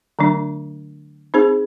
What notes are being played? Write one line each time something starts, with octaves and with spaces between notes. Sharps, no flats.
D3 F#3 A3 D4
C4 D#4 G#4 C5